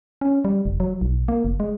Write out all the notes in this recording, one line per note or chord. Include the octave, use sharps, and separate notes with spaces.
C#4
G3
F1
F#3
B1
A#3
F#1
G#3